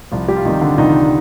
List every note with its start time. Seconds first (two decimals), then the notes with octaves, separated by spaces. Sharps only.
0.11 C2 F3 F4
0.28 G3 G4
0.37 F4
0.45 C3 D#3 G3 D#4
0.61 D3 D4
0.73 F4
0.78 C2 D#3 D#4